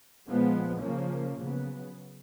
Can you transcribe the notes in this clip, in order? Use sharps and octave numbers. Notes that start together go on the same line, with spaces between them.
A#2 F3 G#3 B3
C#3 F3 A#3 C#4
C#3 F#3 B3